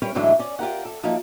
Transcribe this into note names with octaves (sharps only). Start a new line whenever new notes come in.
G3 C#4 A#4 B4 C#5
G#2 D3 E3 F#3 G#3 A3
C#4 D5
F4 G4 A#4 F#5
A4
F3 F#3 A#3 D#4